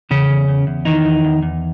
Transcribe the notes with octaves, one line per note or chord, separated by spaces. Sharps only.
E2 C#3 C#4
E2
E2
E2
D#3 E3 D#4
E2
E2
E2